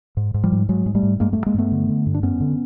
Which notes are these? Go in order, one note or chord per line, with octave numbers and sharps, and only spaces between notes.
G#2
G#2
F3 G3
G#2
G#2 F#3 G#3
G#2 G#3
G3 A3
G#2
G2 G#3 A#3
A3 B3
G2
G#3 A#3
G2 A3 B3
D3
D3
G2
D4
F#2 B3 C#4
D3